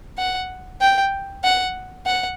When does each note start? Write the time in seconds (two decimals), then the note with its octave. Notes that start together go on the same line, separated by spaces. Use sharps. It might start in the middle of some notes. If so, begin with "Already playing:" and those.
0.18 F#5
0.81 G5
1.44 F#5
2.06 F#5